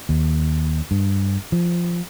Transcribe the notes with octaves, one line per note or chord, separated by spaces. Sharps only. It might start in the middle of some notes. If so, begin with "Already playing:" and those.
D#2
G2
F3